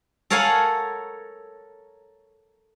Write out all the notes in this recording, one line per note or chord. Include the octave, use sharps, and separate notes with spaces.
A4 A#4 C#5 F5 F#5 G#5